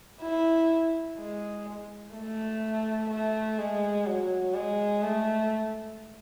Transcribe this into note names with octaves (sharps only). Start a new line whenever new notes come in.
E4
G#3
A3
A3
G#3
F#3
G#3
A3